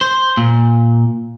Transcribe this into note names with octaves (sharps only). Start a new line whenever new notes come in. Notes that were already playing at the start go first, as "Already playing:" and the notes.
C5
A#2